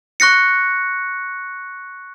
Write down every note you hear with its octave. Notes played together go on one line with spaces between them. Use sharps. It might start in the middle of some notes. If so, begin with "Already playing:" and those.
C#6 F#6 A#6 C#7